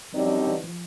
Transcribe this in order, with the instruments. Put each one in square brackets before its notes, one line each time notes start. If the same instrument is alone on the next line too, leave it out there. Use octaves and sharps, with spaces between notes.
[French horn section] F#2 D3 G3 C4 D#4 [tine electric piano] F3
[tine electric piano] E3
F3